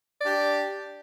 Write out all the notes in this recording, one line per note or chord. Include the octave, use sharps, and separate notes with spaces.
D4 G4 D5